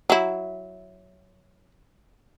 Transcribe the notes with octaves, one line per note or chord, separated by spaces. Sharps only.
F#3 E4